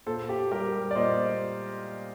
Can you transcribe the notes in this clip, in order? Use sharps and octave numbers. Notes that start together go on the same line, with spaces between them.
A#2 A4 C5
G4
G3 G4 A#4
D5
A#2 C5 D#5